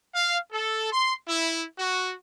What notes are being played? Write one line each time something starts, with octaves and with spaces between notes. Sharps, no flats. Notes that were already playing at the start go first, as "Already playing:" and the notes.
F5
A4
C6
E4
F#4